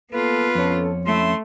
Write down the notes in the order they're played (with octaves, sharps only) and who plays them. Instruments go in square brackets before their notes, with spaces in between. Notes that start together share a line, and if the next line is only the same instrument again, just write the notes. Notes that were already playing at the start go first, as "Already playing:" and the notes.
[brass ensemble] A#3 A4 [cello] B3 F4 [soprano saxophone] B4
[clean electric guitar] F2 C#5 [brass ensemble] C#4 A4
[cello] A3 [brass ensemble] C#4 E4 [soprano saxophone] C6